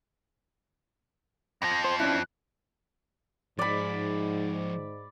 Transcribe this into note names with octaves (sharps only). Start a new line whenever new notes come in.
F2 F3 A#6
C5 C6
C#4 D4 E4 F#6
G#2 F3 G#4 D5 B5